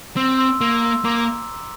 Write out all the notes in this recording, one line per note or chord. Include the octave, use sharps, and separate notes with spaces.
C4 C6 E6
C6 E6
A#3 C6 E6
C6 E6
A#3 A#5 D6